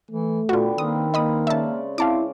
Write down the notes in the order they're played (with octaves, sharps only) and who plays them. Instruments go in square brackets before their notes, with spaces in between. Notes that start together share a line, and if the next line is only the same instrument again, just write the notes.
[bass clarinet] E3 [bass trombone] A3
[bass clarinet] A#2 [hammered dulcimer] D3 G3 B3 [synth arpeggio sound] F4 F#4
[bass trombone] D#3 [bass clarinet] A#3 [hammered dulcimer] C4 B4 [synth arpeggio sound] D#6
[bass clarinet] A#3 [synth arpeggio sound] D#5 B5 D#6
[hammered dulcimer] C#3 G#3 D5 [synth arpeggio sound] E5 A5
[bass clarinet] C4 [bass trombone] E4 [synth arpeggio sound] F5 A5 D6